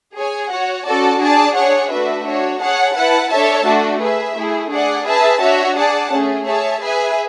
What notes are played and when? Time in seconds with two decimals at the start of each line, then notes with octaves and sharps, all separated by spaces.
0.15 G#4 C#5 G#5
0.50 F#4 C#5 F#5
0.85 C#4 F#4 A4 D5 A5
1.20 D4 G#4 D5 A5
1.55 D4 G#4 C#5 F#5
1.90 A3 D4 F#4 B4 E5
2.25 D4 F#4 C#5
2.60 G#4 C#5 F#5 A5
2.95 E4 B4 F#5 A5
3.30 D4 A4 C#5 E5 A5
3.65 A3 D4 F#4
4.00 G#4 B4 E5
4.35 A3 E4 G#4
4.71 D4 G#4 D5 F#5
5.05 G#4 B4 E5 A5
5.40 D4 F#4 C#5 E5
5.76 G#4 D5 F#5 A5
6.11 A3 C#4 G#4
6.45 G#4 C#5 E5 A5
6.80 G#4 B4 E5 G#5